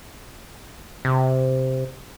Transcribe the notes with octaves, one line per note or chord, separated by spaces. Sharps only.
C3